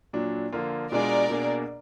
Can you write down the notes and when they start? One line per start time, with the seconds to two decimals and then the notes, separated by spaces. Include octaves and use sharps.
0.13 A#2 F#3 D4
0.52 D3 F3 A#3 F4
0.91 B2 G#3 D4 F4 G#4 A#4 D5
1.30 B2 A#3 D4 G#4